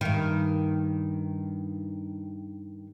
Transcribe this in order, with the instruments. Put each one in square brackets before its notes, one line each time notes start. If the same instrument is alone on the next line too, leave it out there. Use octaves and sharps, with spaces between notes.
[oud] G2 D#3